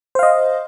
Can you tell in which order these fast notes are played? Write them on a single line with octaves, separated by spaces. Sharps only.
C5 F5 D#5